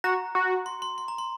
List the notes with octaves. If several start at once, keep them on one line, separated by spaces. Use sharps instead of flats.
F#4 A#5
F#4
C6
C6
C6
A#5
C6